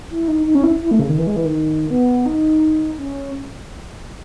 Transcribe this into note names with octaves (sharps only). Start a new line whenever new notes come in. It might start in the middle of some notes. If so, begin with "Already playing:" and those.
E4
D#4
D#4
C#4
E4
E4
A3
C#3
D#3
E3
G#3
E3
D#3
B3
D#4
C#4